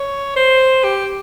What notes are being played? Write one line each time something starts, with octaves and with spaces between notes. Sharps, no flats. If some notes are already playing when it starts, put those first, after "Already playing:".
Already playing: C#5
C5
G4